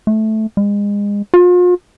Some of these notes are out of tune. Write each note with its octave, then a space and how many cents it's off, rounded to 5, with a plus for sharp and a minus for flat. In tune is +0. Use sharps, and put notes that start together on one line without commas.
A3 -10
G#3 -30
F4 +40